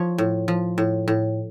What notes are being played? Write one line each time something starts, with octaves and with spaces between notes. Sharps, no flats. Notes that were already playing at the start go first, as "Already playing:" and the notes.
Already playing: F3 C#5
A2
F3
A2
A2